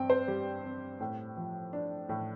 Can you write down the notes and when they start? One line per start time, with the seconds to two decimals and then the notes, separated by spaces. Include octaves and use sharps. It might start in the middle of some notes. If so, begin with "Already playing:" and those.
Already playing: G2 C4 G5
0.10 C5
0.28 G3 G4
0.64 C4
1.00 A2
1.37 F3
1.73 D4
2.09 A2